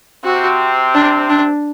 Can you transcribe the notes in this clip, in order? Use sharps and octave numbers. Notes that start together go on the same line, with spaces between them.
C3 C4 F#4
D4
D4